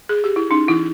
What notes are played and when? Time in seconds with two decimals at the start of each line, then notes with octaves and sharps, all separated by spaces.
0.09 G#4
0.24 G4
0.36 E4
0.50 C#4 D#4
0.68 E3 E4